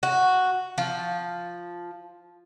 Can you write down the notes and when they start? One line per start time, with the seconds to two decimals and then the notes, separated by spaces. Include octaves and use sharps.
0.03 F#4
0.78 F3